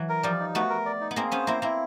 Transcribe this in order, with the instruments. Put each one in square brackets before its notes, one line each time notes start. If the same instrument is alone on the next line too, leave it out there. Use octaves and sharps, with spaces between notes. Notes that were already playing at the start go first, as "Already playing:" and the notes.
Already playing: [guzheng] E3 F#3
[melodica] A#4
[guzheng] F3 G3 [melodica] D5
[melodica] D#4
[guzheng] A3 B3 [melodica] F#4
[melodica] A#4
D5
D#4
[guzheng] B3
[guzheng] A#3 C4 [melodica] G#4
[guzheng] B3 C#4 [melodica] C5
[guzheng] A#3 C4 [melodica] E4
[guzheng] A#3 C4 [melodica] E4